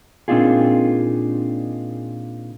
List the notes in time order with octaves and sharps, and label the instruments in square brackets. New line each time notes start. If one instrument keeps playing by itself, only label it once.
[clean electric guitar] A#2 C4 D4 D#4 F4 G#4